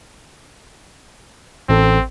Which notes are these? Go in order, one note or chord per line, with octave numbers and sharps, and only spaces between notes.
A1 C4 A4